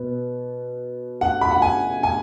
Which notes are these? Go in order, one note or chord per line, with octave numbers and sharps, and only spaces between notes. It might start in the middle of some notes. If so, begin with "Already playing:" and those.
Already playing: B2 B3
F#5
B5
F#5
G#5
G#5